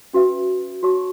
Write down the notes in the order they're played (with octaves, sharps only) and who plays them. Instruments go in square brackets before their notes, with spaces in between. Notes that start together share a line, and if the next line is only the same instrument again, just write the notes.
[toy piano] C#4 F#4 B4 E5
F#4 C#5 A5 C#6